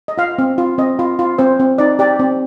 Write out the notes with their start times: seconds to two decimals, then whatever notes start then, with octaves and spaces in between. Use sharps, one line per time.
0.08 D#5
0.18 F4 F5
0.38 C4
0.58 F4
0.78 C4 D#5
0.99 F4
1.19 F4
1.39 C4 C5
1.59 C4
1.78 D#4 D5
1.99 G4 D5
2.19 C4